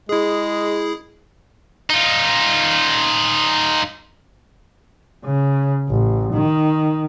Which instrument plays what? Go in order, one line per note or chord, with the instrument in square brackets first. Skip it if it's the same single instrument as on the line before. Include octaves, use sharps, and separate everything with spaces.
[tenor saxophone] G#3 [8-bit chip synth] E4 G#4
[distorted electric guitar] D#4 F4
[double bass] C#3
A1
D#3